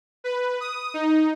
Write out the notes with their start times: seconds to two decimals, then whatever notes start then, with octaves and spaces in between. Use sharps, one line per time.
0.24 B4
0.61 D#6
0.94 D#4